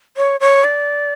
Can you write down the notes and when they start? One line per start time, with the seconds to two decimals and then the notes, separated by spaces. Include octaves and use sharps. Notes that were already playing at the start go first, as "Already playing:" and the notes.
0.17 C#5
0.40 C#5
0.64 D5